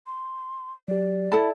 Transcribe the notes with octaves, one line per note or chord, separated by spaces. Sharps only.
C6
F#3 G4 D5
E4 A4 A5 B5